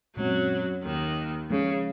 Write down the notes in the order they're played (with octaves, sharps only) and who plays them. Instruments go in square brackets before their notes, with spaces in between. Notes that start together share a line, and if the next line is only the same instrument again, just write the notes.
[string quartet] F#2 F#3 [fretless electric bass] A#2 G#3 C4
[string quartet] D#2 D#3
[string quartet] C#3 [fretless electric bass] F3 G#3 C#4